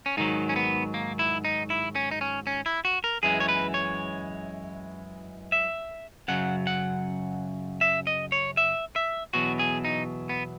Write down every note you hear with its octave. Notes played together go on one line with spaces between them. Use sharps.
C#4
G#2 D#3 F#3 D#4
C#4
B3
A#3
E4
D#4
E4
C#4
D#4
C#4
C#4
E4
F#4
A#4
F#2 E3 G#3 G#4
C#5
B4
C#5
E5
F#2 C#3 F#3 F#5
F#5
E5
D#5
C#5
E5
E5
E2 B2 F#3 F#4
G#4
D#4
B3